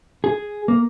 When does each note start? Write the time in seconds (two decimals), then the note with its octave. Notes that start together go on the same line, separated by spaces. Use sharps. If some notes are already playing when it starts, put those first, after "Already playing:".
0.24 G#4
0.68 A#3